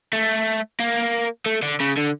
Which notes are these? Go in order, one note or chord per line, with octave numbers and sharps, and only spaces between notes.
A3
A#3
A3
D3
C#3
D3